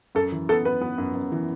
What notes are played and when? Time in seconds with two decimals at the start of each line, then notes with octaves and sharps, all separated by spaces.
0.15 F#2 A4
0.32 E3
0.49 B3 A4
0.65 B3 B4
0.81 B3
0.98 F#2
1.15 F#2
1.32 E3